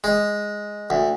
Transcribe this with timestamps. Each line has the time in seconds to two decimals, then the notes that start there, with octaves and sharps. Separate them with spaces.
0.04 G#3
0.90 D2